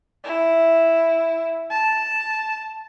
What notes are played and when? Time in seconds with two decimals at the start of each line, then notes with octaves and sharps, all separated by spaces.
0.24 E4
1.70 A5